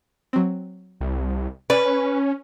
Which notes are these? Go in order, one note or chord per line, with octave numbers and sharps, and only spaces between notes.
F#3 C4
C2
C#4 B4 D5